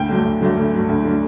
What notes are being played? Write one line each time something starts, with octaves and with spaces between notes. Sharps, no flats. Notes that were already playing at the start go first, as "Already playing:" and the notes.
Already playing: D2 G5
D3 F#3 A3
D2
D3 F#3 A3
D2
D3 F#3 A3
D2
D3 F#3 A3